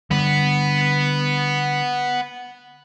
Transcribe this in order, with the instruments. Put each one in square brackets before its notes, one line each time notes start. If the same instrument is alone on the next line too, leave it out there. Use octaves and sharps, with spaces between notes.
[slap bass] D3 G3 [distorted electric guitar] B3 B4